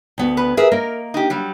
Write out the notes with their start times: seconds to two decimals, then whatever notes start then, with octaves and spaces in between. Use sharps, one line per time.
0.18 D2 B3 F#4
0.37 B4
0.57 G#4 A#4 B4 E5
0.72 A#3 A#4 D#5
1.14 D#4 G4
1.30 F#3 G3